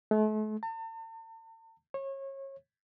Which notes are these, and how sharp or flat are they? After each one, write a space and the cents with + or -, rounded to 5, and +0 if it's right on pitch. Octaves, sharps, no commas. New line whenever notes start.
A3 -40
A5 +45
C#5 -30